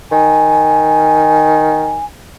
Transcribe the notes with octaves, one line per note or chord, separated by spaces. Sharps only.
D#3 G#5